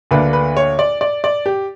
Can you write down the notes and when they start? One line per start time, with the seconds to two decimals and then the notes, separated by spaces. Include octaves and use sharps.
0.11 D2 D3 A#3 D4 B4
0.33 B4
0.57 C#5
0.79 D5
1.01 D5
1.24 D5
1.46 G4